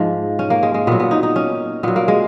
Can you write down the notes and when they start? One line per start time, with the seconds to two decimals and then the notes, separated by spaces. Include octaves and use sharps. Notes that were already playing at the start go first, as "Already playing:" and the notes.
Already playing: G#2 F3 G#3
0.39 C#4
0.50 A#3
0.63 G#3
0.74 G#3
0.87 A#2 F#3 B3
1.00 B3
1.11 D#4
1.23 D#4
1.36 C#4
1.83 A#2 F#3 B3
1.96 A#3
2.08 G#3